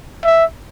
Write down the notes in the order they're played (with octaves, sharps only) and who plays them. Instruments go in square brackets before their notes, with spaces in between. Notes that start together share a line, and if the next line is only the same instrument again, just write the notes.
[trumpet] E5